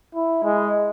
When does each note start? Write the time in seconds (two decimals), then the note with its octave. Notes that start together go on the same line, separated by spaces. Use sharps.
0.15 E4
0.44 G#3